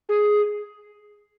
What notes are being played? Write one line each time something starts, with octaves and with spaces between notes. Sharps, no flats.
G#4